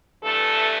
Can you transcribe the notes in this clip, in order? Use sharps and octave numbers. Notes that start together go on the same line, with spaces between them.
G2 E3 A3 A4